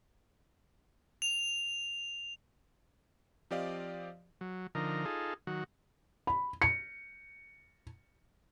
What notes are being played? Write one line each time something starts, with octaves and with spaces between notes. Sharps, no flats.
F7
F3 C4 G4 D5 D#5 F5
F#3
D3 F3 D#4 A#4
D#4 F4 G#4 A4
D#3 F#3 F#4
B5
C#7